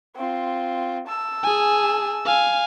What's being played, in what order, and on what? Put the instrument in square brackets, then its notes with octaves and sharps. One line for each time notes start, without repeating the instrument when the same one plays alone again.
[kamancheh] C4 F4
A5 E6
[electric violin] G#4 G#5
F5 G#5